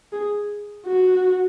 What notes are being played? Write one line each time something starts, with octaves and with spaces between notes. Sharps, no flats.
G#4
F#4